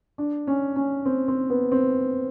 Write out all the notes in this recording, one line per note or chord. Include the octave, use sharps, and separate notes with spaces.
D4
C#4
C#4
C4
C4
B3
C4